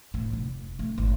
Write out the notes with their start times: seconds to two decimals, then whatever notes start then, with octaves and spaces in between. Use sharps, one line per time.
0.14 A2
0.33 F1
0.79 A3
0.98 G#1